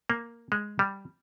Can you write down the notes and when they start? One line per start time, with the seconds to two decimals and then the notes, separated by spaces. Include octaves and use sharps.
0.10 A#3
0.52 G#3
0.79 G3